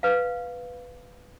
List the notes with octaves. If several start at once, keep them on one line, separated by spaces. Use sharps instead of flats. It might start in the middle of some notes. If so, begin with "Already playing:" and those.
B4 F5